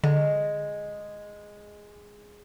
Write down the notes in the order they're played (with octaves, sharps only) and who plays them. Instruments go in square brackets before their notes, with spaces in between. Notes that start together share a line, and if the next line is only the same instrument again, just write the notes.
[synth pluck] D3 [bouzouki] G#3